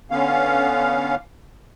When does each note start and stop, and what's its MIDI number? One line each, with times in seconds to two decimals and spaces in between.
0.11 1.15 50
0.11 1.15 59
0.11 1.15 61
0.11 1.15 77